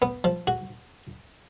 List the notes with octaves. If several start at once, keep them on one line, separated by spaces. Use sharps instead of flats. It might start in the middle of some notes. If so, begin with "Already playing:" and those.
B3
F3
F#4